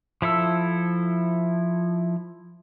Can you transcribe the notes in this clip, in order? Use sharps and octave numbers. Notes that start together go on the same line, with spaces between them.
F3 E4 A4 E6